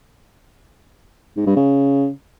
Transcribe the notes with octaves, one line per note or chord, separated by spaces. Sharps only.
G#2
G2
C#3